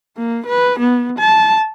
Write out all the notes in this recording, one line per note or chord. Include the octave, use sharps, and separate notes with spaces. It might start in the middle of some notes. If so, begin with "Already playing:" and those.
A#3
B4
B3
A5